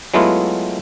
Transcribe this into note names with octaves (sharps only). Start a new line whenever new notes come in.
F#3 G#3 A3 B3 E4 F4